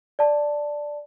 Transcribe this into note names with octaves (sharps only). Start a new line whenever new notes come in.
D5 A5